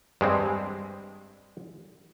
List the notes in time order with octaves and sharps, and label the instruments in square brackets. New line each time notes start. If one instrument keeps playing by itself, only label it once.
[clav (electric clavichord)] G2 G#3 C4